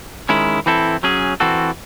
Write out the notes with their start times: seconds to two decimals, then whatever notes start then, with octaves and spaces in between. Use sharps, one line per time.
0.29 D#3 G#3 C#4 E4
0.66 E3 C4 E4 A4
1.03 F#3 C#4 G#4
1.40 E3 C4 F#4 A4